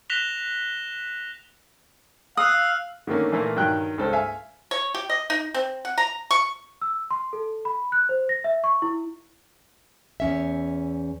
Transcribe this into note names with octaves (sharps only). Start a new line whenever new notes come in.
F#6 A#6 B6 E7 F7 G7
F5 D#6 E6 F#6
D3 D#3 A3 A#3 C#4
A#2 E3 A3 A#3
G2 D#3 F#3 G5 F#6
C#2 G2 A4 C5
E5 F5 G#5
C#5
G4
D#5
D#4
C4
F#5
A#5
C#6
E6
C6
A4
B5
F#6
C5
A#6
E5
C#6
E4
E2 C#4 E5